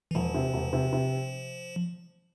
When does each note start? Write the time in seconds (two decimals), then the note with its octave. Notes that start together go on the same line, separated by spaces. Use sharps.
0.11 E3
0.15 E1 F3
0.34 C3
0.54 E1
0.73 C3
0.93 C3